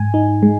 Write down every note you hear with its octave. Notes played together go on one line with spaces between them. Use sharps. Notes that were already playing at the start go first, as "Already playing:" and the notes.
Already playing: G#2 G#5
D#4
G#3